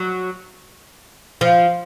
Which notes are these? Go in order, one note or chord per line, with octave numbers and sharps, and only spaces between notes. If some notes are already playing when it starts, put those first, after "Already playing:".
Already playing: F#3
F3